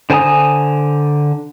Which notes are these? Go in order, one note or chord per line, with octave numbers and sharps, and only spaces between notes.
D3 C5 G#5 A#5 D#6